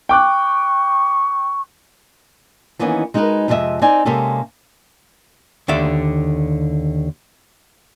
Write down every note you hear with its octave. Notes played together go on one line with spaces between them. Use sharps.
G5 C#6 D6 F#6
D#3 E3 A#3 B3 C#4 D#4
G#3 D#4 F#4 G4 A#4 B4
F2 C3 G#3 A4 D#5 E5
C4 D#4 D5 G#5
C3 G#3 A#3 C#4 G4 A4
D#2 D3 D5 E5